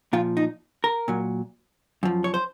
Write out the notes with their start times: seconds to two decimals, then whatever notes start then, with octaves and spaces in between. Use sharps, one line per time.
0.13 A#2 F3 F4
0.37 D#4
0.84 A#4
1.08 A#2 F#3
2.03 F#2 F3
2.24 C#5
2.34 C5